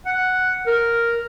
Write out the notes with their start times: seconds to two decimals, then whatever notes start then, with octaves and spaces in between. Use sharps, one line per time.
0.06 F#5
0.67 A#4